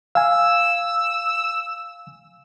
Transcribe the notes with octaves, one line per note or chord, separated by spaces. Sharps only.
F5 G#5 E6